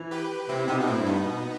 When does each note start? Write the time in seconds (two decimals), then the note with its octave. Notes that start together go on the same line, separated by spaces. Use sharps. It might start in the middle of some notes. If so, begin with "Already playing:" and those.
Already playing: E3
0.11 G4 B4
0.49 C3 C4 E4
0.68 C3 B3 D#4
0.79 B2 D#4
0.87 A2 C4 E4
1.00 G2
1.06 B3 D#4
1.25 B2